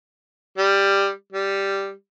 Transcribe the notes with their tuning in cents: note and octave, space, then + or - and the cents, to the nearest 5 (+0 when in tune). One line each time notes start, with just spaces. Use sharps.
G3 +10
G3 +0